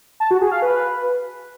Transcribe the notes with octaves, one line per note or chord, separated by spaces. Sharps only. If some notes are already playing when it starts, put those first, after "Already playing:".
A5
F#4
G#4
F5
B4